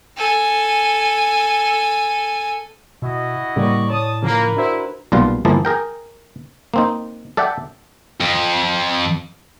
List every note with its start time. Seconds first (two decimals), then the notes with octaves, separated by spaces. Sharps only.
0.17 A4 G#5
3.02 B2 E4 F#4 D#5
3.56 A2 C#3 G3 A#3 D5 C#6
3.90 C#5 A5 D#6
4.23 C#3 F3 A#3 A#4 B4
4.57 D4 E4 F#4 C5
5.12 B1 A#2 G3 F4 B4 F5
5.45 G1 F3 A#3 E4 G#4 A4
5.65 G#4 A#4 G5
6.74 A#3 C4 D#4
7.37 A4 D5 E5 F#5 G5
8.21 F2